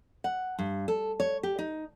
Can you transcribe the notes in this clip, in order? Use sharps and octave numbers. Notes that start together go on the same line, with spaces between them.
F#5
G2
A4
C#5
G4
D#4